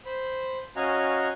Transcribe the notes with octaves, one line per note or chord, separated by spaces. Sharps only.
C5 B5
C#4 F#4 D#5 F5 G#5 A#5